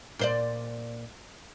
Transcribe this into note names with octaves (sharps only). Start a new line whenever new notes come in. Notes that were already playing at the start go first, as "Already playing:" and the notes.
A#2 C5 D5